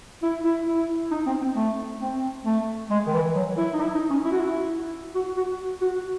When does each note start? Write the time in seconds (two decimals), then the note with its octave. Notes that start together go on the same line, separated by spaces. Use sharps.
0.23 E4
0.44 E4
0.67 E4
1.12 D#4
1.26 C4
1.42 C4
1.56 A3
2.01 C4
2.45 A3
2.91 G#3
3.07 D#3
3.13 E3
3.35 F#3
3.58 E4
3.74 D#4
3.80 E4
3.95 D#4
4.10 C#4
4.25 E4
4.32 F#4
4.40 E4
5.15 F#4
5.37 F#4
5.81 F#4